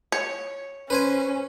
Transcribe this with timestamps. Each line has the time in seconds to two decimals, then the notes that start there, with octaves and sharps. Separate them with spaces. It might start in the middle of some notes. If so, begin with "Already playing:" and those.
0.12 C#5
0.90 C#4 B4 C5 G#5